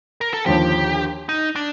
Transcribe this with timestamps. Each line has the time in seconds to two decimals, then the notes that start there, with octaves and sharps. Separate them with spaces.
0.21 A#4
0.33 A4
0.46 D#2 D3 F3 G4
1.29 D#4
1.56 D4